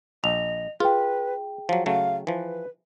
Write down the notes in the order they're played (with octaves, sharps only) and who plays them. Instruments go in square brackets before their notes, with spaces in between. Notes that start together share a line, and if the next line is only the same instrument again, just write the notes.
[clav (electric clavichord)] A#1 [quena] D#5 [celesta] F7
[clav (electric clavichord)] F4 [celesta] G#4 G5 [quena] B4
[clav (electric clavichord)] F3 F#3 [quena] F5
[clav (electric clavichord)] C#3 F#3 A3 [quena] F5
[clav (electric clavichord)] E3 F3 [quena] B4